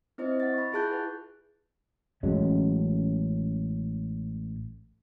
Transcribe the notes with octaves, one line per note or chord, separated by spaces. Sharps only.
C4 E4 C5 D#5
F#5 A6
B5 C#6
E4 F4 G#4 A5 F#6 G6
B4 F#5
A1 F#3 G#3 C#4